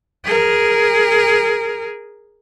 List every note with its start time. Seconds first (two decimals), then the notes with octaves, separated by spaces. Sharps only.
0.25 G#4 A#4